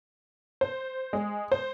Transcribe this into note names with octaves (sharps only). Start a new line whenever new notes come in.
C5
G#3
C5